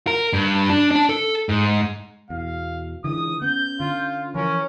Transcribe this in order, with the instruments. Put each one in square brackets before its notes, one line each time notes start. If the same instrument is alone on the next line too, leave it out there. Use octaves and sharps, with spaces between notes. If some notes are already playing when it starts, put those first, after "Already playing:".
[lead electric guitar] A#4
G2
D4
D4 A5
A4
G#2
[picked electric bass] E2 [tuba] B2 [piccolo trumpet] F5
[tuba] C#2 [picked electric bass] D3 E3 [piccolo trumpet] D#6
[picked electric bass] B3 [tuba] C#4 [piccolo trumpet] G6
[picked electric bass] D3 [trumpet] F4
[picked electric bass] E3 F3 [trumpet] C#4 [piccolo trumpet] A#4